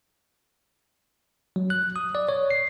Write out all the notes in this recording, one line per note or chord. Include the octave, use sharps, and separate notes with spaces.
F#3
F#6
D#6
D5
C#5
C7